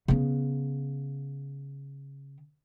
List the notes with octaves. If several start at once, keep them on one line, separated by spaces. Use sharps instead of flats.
C#3 B3